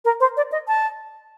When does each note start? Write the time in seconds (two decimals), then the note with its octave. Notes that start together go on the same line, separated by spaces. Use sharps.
0.05 A#4
0.20 C5
0.37 D5
0.52 D#5
0.68 A5